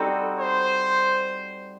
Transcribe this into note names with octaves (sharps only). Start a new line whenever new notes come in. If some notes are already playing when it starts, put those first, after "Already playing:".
Already playing: G3 C4 D#4 F#4 A4
C5